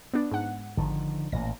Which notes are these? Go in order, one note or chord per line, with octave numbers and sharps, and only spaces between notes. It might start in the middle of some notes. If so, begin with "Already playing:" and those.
B3 D4
G#2 F#5
G#1 D3 D#3 F3
A1 A#2 A#6